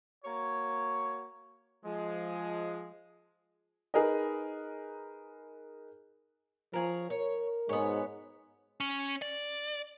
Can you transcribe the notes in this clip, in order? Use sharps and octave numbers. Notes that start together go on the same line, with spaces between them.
A#3 F#4 C#5
F3 G#3
D#4 G#4 A#4 B4 D#5
F3 C#4 G#4 A#4
A#4 C#5
G#2 B2 G#3 B3 C#5
C#4
D5